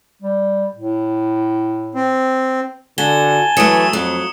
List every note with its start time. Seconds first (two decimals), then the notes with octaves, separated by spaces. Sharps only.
0.22 G3
0.75 A2
1.95 C4
2.98 D3 F#4 G#5 A5 G7
3.57 E3 F#3 A3 D#6 C#7 E7
3.93 F2 F#3